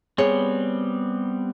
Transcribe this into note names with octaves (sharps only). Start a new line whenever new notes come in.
G3 B3 C4 G#4 C#5